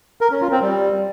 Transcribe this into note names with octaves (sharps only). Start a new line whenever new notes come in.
A#4
C#4
F4
C4
G3